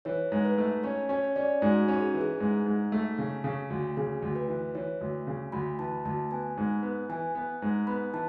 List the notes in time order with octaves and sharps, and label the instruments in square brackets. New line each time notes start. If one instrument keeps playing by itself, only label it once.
[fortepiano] E3 [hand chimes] C#5
[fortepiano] G#2
[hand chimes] B4
[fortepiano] A3
[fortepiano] C#4 [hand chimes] C#5
[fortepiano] C#4 [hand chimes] C#5
[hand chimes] C#5
[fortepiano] C#4 [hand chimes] D5
[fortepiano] G#2 [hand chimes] F#4
[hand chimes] F#4
[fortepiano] C#4
[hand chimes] G#4
[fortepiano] E3
[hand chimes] G#4
[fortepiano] G#2
G#2
A3
C#3
C#3
D2
[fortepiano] C#3 [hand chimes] G#4
[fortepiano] D2
[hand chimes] B4
[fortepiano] E3
[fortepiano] E3 [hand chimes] C#5
[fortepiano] D2
C#3
[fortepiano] D2 [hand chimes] B5
[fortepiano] E3 [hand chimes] A5
[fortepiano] D2 [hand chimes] A5
[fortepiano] B3 [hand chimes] G#5
[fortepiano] G#2
B3
[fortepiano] E3 [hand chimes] G#5
[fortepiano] B3
G#2
[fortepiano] B3 [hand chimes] B5
[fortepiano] E3 [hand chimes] A5